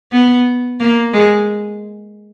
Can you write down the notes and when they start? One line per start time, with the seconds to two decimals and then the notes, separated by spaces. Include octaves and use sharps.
0.12 B3
0.80 A#3
1.13 G#3